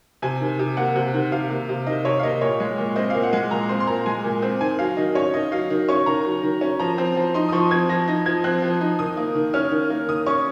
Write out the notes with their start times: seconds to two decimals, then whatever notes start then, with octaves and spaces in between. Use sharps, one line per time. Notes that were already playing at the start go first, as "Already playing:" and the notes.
0.22 C3 G#5
0.41 D#3
0.59 C3
0.77 A#3 F#5
0.96 C3
1.14 D#3
1.32 C3 F5
1.50 A#3
1.69 C3
1.86 D#3 D#5
2.05 C3 C#5
2.19 F5
2.23 A#3 D#5
2.41 A#2 C#5
2.60 G#3
2.78 A#2
2.96 C4 D#5
3.10 A#2 F5
3.23 F#5
3.33 G#3
3.51 A#2 A#5
3.69 C4 C6
3.80 C6
3.87 A#2 A#5
4.06 G#3 G#5
4.24 A#2
4.42 C4
4.61 D#3 G#5
4.79 F#3 F5
4.97 D#3 D#5
5.15 C#4 C#5
5.33 D#3 D#5
5.52 F#3 F5
5.70 D#3
5.88 C#4 C#6
6.06 D#3 A#5
6.25 F#3
6.43 D#3
6.61 C#4
6.79 F3 A#5
6.98 C4
7.16 F3
7.34 D#4 C6
7.49 D#6
7.52 F3 C#6
7.71 C4 G#6
7.89 F3 A#6
8.08 D#4 A#6
8.26 F3 G#6
8.44 C4 F#6
8.62 F3
8.81 D#4
8.99 D#3 D#6
9.17 A#3
9.35 D#3
9.54 C#4 F6
9.71 D#3
9.90 A#3
10.08 D#3 D#6
10.26 C#4 C#6